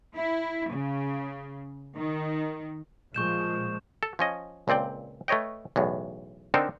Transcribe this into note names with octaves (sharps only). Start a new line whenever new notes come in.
E4
C#3
D#3
A#2 F3 G#3 C#6 G6 E7
A4
F3 C#4 D#5
C#2 A#2 C4 D5 G5
A3 B4 C#5 D#5 G5
B1 E2 A2
D3 C4 D4 D#4 A4 A#4